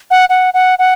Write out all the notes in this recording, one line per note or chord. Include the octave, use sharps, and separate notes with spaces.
F#5
F#5
F#5
F#5